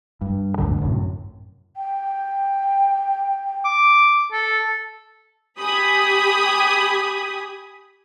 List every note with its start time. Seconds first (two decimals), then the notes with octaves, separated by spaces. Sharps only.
0.21 G2
0.58 A1 D2 G2 D3
0.82 F#2 A2 C3
1.76 G5
3.65 D6
4.32 A4
5.60 G4 G#5 B5 D#6